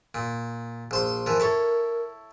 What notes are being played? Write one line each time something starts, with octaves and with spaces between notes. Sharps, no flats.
A#2
A#1 C5 C6
E3 F3 A#4
E4 A4 C#5